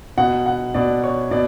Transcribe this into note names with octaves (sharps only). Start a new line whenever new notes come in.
B2 F#5
F#5
B2 D5
C#5
B2 D5